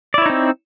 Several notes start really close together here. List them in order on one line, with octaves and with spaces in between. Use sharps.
D5 E4 C#5 D#4 C4